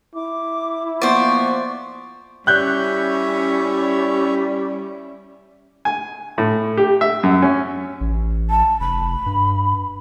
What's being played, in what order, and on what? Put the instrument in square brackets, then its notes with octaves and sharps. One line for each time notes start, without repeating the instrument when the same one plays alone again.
[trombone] E4 [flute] D6
[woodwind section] F3 A#3 B3 [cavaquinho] C5 D5 [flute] C#6
[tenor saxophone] G3 [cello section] C#4 E4 [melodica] C#5 E5 [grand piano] F#6 G6
[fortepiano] G#5
A2
G4
E5
F#2
C#4
[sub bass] A1
[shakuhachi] A5
[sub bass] F1 [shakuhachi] B5
[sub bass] G2